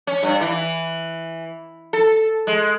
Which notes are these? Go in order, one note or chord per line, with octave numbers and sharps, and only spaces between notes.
C#4
G2
E3
A4
G#3